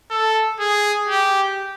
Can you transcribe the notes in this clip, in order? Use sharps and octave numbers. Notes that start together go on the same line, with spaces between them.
A4
G#4
G4